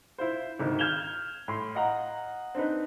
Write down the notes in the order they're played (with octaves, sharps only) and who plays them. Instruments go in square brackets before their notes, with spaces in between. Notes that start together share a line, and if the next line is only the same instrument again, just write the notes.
[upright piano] E4 F4 C5
G#1 D2 D#3
F6 G6 G#6 E7 F7 G7
A2 C6
D#5 F5 F#5 A#5
C4 D4 D#4 B4